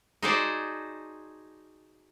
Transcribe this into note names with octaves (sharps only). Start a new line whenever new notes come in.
D#4 F#4 G#4 A4 C5 D5